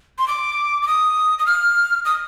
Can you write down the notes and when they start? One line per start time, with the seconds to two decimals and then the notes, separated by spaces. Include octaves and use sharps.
0.18 C6
0.28 D6
0.82 D6
0.87 D#6
1.39 D#6
1.46 F6
2.05 D#6